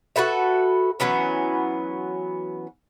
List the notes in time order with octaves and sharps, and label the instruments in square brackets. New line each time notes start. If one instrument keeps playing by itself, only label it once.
[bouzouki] F#4 A4 B4 E5
E3 F#3 B3 C#4